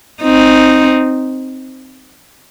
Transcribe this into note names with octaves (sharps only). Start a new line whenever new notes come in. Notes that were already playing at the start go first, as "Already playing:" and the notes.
C4 D#4